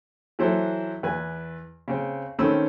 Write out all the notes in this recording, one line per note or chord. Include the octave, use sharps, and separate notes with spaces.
E3 F#3 E4 A4 C5
E2 B4 G#5
C#3 C4
D#3 A3 C4 C#4 B5 E6